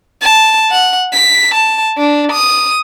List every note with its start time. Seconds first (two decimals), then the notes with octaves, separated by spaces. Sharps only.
0.22 A5
0.71 F#5
1.13 B6
1.55 A5
1.98 D4
2.32 D#6